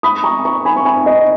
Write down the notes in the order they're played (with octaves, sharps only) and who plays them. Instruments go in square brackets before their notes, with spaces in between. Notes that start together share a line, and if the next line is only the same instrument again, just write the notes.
[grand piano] B5 D#6
A#5 C#6
A#5 C#6
G#5 B5
C#6
G#5 B5
D#5